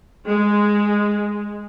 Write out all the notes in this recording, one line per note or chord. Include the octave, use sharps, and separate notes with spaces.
G#3